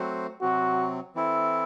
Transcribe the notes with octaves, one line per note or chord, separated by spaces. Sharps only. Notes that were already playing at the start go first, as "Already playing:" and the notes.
Already playing: F#3 A3 C4 F#4 C5
C3 F#3 C4 F#4
E3 C4 E4 A4